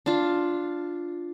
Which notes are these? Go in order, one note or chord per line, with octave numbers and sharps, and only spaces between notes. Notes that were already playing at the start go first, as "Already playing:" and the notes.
D4 F4